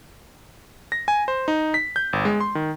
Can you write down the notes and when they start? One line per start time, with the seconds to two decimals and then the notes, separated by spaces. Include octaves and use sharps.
0.92 A#6
1.08 G#5
1.28 C5
1.48 D#4
1.74 B6
1.96 G6
2.13 G1
2.25 G#3
2.40 C6
2.55 D#3